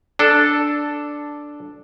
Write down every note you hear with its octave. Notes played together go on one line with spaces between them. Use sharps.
D4 A4